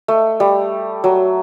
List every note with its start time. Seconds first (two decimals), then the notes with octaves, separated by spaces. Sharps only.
0.08 A3
0.40 G3
1.04 F#3